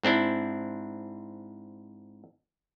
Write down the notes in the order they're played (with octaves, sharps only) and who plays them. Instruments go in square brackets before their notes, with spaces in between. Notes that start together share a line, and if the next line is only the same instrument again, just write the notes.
[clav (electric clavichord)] G#2 C4 D4 E4